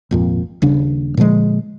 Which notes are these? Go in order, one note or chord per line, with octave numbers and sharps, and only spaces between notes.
G#1 F2 A#2
D#1 C#3 D4
A#2 D3 F3 G#3